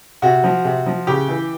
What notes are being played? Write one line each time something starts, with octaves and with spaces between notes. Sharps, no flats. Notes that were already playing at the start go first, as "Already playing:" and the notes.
C3 F#4
F3
C3
F3
C#3 G4
E3